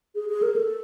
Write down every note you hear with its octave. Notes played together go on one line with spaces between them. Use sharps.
G#4
G#4
A#4
A4